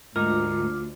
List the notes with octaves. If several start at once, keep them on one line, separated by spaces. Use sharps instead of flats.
D2 G#2 D#4 F4 A#4 D6 F6